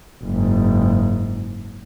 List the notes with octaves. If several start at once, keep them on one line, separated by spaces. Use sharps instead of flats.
F#1 G#2